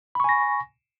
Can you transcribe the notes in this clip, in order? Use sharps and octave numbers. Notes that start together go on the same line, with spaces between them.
G#5 B5 C#6 A#6